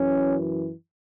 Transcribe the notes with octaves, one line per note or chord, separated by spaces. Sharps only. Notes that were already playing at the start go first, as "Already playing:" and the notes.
Already playing: F#2 E3 C#4